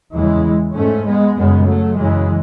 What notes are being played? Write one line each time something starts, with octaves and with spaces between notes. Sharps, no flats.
E2 C#3 E3 G#3
G#2 A3 C#4
G#3 B3
F#2 C#3 G#3 B3
F#3 A3
F#2 C#3 E3 G#3